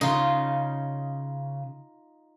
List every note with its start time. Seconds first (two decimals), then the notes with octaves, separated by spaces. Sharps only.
0.01 C#3 D#4 F4